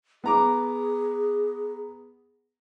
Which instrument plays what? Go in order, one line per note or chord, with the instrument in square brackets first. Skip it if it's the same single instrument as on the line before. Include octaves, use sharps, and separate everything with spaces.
[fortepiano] B3 A#5 D6 [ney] G#4